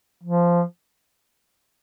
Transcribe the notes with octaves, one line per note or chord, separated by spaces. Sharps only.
F3